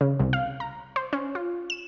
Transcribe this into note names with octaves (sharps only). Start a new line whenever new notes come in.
C#3
C2
F5
A#5
C5
C#4
F4
E7